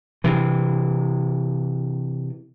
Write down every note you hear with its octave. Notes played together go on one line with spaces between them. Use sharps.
C3 E3